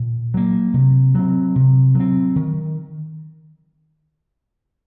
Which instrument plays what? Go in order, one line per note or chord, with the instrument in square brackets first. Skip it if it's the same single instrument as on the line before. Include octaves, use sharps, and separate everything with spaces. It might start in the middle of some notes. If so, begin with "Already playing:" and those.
Already playing: [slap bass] A#2
F#3 A#3
C3
F#3 C4
C3
F#3 C4
D#3